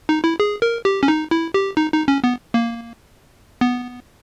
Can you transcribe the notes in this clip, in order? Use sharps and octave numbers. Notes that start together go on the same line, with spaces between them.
D#4
E4
G#4
A#4
G4
C#4
D#4
E4
G4
D#4
D#4
C#4
B3
A#3
B3